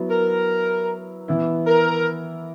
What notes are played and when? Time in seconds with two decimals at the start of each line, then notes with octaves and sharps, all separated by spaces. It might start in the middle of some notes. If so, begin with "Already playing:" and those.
Already playing: F#3 B3 E4
0.10 A#4
1.28 E3 B3 E4
1.67 A#4